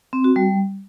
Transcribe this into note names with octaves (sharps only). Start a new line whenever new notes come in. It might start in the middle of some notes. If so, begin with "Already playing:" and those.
C4
F#4
G3